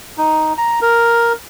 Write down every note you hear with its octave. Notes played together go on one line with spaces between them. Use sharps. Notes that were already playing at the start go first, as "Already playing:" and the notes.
D#4
A#5
A#4